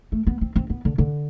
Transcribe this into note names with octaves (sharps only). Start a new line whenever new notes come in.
A3
B3
C4
C4
B3
D3
D3